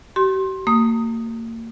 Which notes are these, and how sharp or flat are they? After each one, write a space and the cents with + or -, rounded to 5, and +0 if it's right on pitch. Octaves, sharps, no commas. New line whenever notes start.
G4 -45 C6 +20
A#3 -35 D#6 +0